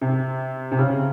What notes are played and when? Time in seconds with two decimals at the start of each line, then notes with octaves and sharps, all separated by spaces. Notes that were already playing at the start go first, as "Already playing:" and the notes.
0.01 C3
0.72 C3
0.79 C#3